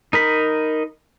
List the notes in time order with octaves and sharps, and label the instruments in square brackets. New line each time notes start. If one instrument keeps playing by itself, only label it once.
[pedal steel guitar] D#4 A#4 B5